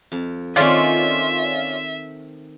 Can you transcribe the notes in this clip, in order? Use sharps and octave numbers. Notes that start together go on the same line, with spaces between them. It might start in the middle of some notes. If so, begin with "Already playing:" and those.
F2
D#3 A3 C4 C#4 F4 D5 E5